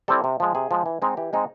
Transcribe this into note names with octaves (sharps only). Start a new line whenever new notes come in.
G3 C4 E4 A4
C3
F3 G#3
C3 G#4
F3 G#3
E3
G#3 C4 D#4
E3 G4
G#3 C4 D#4